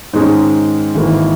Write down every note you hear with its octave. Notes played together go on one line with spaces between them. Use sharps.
G#2 D#3 G#3 C#4
G#1 G#2 E3 A#3